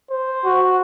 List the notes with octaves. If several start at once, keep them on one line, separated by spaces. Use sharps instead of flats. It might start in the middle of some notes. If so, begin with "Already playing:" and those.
C5
F#4